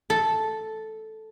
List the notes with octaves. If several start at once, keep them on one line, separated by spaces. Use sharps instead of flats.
A4